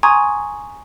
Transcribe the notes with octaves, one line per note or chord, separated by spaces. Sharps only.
G#5 A#5 C6 C#6 D#6 G#6